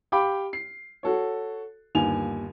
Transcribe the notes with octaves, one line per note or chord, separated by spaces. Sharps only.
G4 F5 G5 B5 D6
C7
F#4 A4 C#5
G1 D#2 G#5 F7